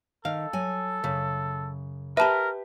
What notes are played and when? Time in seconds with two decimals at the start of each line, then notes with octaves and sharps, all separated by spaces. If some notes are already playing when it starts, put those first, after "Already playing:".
0.25 D#3 A4 F5
0.53 F#3 G#5
1.04 F#2 C#3
2.17 G4 A#4 B4 E5 A5